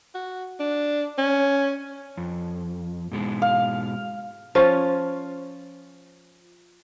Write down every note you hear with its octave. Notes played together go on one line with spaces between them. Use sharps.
F#4
D4
C#4
F2
G#2 B2 G#3
F5
F3 C#4 F4